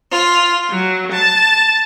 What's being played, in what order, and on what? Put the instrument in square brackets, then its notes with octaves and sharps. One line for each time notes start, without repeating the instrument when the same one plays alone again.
[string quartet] F4
F#3
A5